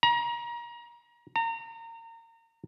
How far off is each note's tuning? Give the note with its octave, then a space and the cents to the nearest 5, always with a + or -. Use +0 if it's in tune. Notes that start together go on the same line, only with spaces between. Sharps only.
A#5 +30
A#5 -30